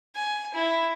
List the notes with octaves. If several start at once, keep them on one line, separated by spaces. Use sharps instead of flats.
G#5
E4